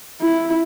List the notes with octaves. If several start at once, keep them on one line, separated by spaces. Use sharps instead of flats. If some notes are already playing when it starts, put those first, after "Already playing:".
E4